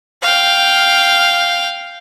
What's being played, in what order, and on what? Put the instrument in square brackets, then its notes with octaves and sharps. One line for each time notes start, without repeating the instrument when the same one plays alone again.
[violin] F5 G5